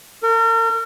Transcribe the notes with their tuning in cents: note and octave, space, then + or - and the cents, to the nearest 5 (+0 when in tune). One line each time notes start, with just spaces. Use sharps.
A#4 -40